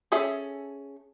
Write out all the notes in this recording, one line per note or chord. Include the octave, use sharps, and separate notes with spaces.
C#4 G#4 A4 E5